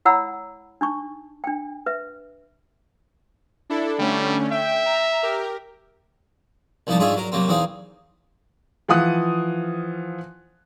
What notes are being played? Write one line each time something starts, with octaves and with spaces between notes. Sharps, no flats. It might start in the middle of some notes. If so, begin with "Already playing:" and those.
E4 C#5 F#5 A#5 B5 E6
D4 D#4 C#6
D4 G5
B4 E5
D4 E4 A4
D3 G3 A3 C#4
E5 G5
A#5
G4 A#4
C2 F3 G3 D#4 A5
G#2 D4 F4 G#4 C#5 E5
F#3 A#4
C3 F#3 A#3 C4
E2 C4 D#4 G#4 F5
E3 F3 F5 F#5 D#6 F#6